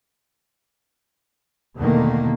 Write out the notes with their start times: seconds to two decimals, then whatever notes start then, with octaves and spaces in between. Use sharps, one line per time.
1.78 E2 B2 D3 D#3 A3 A#3